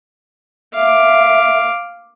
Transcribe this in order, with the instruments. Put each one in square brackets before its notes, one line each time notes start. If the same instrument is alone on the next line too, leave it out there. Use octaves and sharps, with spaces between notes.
[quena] E5 [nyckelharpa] F5 D6